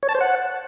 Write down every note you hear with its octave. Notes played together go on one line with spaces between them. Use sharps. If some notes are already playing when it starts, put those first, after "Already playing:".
C#5
A5
C5
F#5